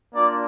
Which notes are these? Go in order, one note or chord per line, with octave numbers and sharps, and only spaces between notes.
A#3 D4 F4 D5